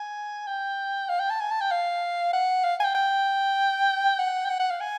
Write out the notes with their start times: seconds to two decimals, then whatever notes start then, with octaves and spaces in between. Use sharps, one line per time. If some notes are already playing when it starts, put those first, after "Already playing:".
Already playing: G#5
0.47 G5
1.09 F5
1.19 G5
1.30 A5
1.40 G#5
1.50 A5
1.60 G5
1.71 F5
2.33 F#5
2.64 F5
2.80 G#5
2.84 G5
2.95 G5
4.19 F#5
4.45 G5
4.49 F#5
4.59 F#5
4.70 F5
4.80 G#5